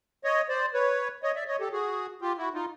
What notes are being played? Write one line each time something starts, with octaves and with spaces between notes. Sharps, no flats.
C#5 D#5
C5 D5
B4 C#5
C#5 D#5
D5 E5
C#5 D#5
G4 A4
F#4 G#4
F4 G4
E4 F#4
D#4 F4